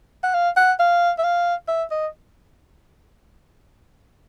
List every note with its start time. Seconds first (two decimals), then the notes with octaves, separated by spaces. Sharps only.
0.24 F#5
0.34 F5
0.57 F#5
0.80 F5
1.18 E5
1.24 F5
1.68 E5
1.91 D#5